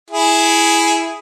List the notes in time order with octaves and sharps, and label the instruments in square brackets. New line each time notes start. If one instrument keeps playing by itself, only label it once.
[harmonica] E4 G#4